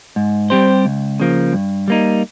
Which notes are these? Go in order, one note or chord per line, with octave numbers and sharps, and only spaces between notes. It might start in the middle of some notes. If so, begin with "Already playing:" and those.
G#2
G3 C4 G4 C5
C#2
C#3 F3 A#3
G2
G3 A#3 D#4